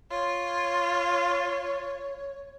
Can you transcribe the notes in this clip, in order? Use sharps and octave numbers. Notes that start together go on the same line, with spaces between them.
F4 C#5